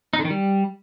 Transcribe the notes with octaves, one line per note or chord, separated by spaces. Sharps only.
D#4
D3
D#3
G3